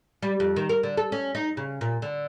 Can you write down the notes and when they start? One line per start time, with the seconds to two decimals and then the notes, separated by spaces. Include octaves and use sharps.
0.22 G3
0.40 F2
0.56 D#3
0.69 A#4
0.83 D3
0.97 A4
1.12 C#4
1.35 D#4
1.57 C#3
1.81 A#2
2.02 D3